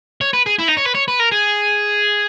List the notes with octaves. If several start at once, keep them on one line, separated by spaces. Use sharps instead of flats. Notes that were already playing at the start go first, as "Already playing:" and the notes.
C#5
B4
G#4
E4
D#4
C#5
B4
C#5
B4
A#4
G#4